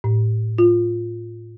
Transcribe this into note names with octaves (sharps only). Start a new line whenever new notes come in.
A2
F4